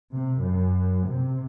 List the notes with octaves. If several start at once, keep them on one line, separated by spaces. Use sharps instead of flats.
C3
F#2
C3